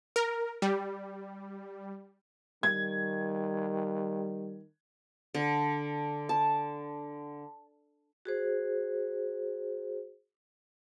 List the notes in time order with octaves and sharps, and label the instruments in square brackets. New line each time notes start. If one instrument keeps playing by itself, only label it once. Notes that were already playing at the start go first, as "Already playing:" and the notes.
[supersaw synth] A#4
G3
[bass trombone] D#3 [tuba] G3 [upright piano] G#6
[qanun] D3
A5
[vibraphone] F#4 G#4 C5